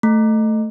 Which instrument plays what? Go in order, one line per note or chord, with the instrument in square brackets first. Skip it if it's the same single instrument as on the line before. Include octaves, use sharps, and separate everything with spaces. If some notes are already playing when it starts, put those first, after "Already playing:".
[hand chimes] A3